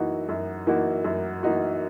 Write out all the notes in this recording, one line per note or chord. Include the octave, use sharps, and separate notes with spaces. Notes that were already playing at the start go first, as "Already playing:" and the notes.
Already playing: F#2 E3 A#3 D#4 F#4
F#2
E3 A#3 D#4 F#4
F#2
E3 A#3 D#4 F#4